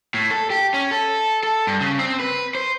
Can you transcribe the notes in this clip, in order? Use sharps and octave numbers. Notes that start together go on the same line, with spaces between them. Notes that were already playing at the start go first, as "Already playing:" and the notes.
A2
A4
G4
C#4
A4
A4
G2
C#3
C4
B4
C5